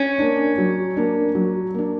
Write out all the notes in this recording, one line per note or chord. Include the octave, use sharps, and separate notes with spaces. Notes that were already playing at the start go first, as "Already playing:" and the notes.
Already playing: C#4
A#3 D4
F#3
A#3 D4
F#3
A#3 D4